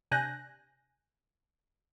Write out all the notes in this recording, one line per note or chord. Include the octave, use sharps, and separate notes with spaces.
C3 D4 G#5 F#6 G6 A#6